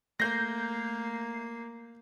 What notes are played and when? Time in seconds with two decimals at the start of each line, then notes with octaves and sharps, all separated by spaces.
0.20 A3 A#3 G6 A#6 C7